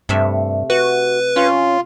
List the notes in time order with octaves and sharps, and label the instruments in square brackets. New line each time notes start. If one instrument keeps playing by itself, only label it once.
[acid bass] G2 [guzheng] C3 A3 E5
[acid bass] F#4 [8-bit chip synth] B4
[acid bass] C#4 [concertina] F4